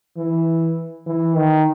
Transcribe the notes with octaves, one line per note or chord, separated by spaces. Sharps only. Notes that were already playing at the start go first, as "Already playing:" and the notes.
E3
E3
D#3